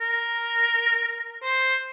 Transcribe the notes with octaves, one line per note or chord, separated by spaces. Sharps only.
A#4
C5